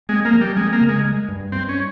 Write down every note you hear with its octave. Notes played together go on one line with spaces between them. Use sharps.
G#3 C4
A#3
F3
G3
G#3 C4
A#3
C#3
G#3
G#3
G2
G2 C4
C#4